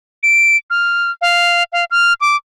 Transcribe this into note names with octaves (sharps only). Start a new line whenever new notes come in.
D7
F6
F5
F5
F6
D6